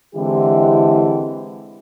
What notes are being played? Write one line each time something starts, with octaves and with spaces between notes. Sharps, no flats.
D3 E3 G#3 C4 E4 G4